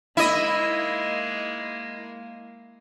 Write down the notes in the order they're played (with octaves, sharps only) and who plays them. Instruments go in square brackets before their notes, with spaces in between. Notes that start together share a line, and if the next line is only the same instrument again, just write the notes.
[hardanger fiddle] G#3 A#3 [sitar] E4 D#5